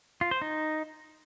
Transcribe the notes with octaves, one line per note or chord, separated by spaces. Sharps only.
F4
C5
D#4